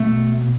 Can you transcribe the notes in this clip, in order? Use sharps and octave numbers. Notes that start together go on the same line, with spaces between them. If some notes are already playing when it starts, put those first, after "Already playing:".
Already playing: B2 A3